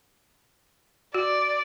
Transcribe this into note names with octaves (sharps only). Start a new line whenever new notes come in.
F#4 D5